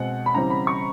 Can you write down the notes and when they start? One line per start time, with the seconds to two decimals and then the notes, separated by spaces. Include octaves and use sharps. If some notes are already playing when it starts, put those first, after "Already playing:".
Already playing: B2 G#3 C4 F#5
0.26 B5
0.34 C#3 E3 G3 C4 A#5
0.50 B5
0.67 C#6